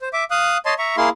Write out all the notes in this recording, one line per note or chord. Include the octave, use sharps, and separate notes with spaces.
C5
E5 D6
F5 D#6 F#6
C#5 D#5 A5 C6
E5 A#5 C#6
A#3 E4 G#4 F5 C6